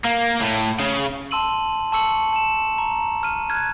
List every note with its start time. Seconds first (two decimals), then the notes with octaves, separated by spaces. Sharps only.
0.04 A#3
0.41 A2
0.79 C#3
1.31 A5 C6 E6 D#7 F#7
1.92 A5 C#6 E6 C#7 F#7
2.33 A5 E7
2.78 A#5
3.23 F6 D#7
3.50 F6 F#6 G#6